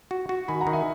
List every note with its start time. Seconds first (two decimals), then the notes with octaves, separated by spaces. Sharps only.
0.11 F#4
0.29 F#4
0.48 D#3 G#5 B5
0.60 F#5 A#5
0.67 D#3
0.73 E5 G#5